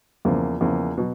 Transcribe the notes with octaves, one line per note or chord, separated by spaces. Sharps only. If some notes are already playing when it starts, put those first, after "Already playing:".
E2 C#3 F3 A#3
E2 C#3 F3 A#3
B2 F#3